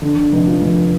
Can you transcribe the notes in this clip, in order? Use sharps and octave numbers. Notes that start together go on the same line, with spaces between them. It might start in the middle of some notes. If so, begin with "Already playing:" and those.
D3
D3
F1
F3
F1